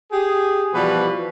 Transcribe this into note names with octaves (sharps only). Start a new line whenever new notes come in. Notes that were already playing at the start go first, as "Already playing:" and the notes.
G4 G#4
B2 E3 F3 G3 F#4 B4